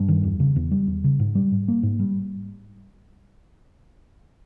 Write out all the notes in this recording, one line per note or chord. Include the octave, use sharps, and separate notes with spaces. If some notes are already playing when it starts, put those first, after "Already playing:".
Already playing: G2
D#3
E2
C#3
E2
G3
E2
C#3
G#2
G3
G#2
A#3
G#2
G3